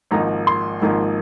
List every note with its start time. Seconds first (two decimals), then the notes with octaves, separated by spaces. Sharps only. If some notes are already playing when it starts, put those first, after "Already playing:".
0.11 G#1 G#2 F3 A#3 D#4 A#5
0.47 C6
0.82 G#1 G#2 F3 A#3 D#4